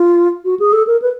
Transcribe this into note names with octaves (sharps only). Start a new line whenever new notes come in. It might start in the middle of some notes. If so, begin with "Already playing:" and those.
Already playing: F4
F#4
G#4
A4
A#4
B4